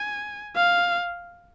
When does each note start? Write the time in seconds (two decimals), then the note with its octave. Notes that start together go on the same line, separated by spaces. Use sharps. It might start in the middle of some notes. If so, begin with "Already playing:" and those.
Already playing: G#5
0.56 F5